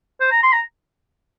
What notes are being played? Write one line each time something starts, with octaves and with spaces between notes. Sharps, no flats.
C5
A#5
C6
A#5